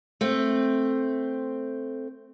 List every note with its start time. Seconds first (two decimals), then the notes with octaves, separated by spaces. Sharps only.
0.21 A3 C4